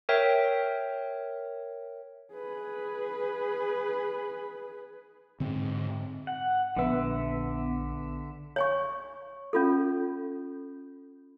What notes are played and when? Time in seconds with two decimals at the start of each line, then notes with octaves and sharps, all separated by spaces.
0.09 A#4 C#5 E5 G5
2.33 G#4 B4
5.40 G#2 D3 C4
6.27 F#5
6.77 A#1 D3 B3 E5
8.56 C#5 G#5 C#6
9.53 C#4 F4 A4